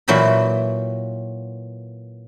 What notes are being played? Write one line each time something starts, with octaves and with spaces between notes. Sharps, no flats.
A#2 E3 F#3 G5 B5